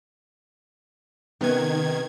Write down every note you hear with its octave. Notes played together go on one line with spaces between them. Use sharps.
C3 D#3 B3 C#4 G#6